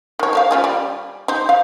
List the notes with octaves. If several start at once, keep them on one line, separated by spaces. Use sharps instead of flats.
D#3 C#5
C5 C#5 F5
C#3 F4 G#4
G3
D#4 C5
F5